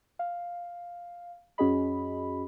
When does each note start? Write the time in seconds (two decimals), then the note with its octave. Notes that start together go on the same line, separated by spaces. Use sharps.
0.19 F5
1.58 F#2 C#4 F#4 G#4 D#5 B5